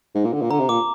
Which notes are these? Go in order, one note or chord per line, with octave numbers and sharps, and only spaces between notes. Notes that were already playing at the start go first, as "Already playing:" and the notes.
G#2
A#2
D3
A#2
D3 A#5
C3
A#2 D6